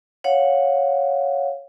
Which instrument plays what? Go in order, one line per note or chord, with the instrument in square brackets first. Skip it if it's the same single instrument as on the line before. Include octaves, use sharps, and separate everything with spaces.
[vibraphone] C#5 F5 F#5